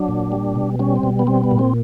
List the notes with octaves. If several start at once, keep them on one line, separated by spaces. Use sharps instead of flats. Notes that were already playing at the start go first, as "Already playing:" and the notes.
Already playing: F#3 D4
A#2
G3
B2
G3 C#4
C4
B2
B3
G3 C4
B3
A#2
C4